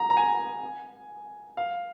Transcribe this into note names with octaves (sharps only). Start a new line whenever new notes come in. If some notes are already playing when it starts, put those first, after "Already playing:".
Already playing: A#5
A#5
G#5
F5